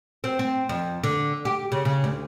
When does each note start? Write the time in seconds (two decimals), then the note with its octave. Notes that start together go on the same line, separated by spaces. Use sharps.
0.24 C4
0.39 C4
0.69 F2
1.04 D3
1.45 G4
1.72 C#3
1.85 C#3
2.04 D2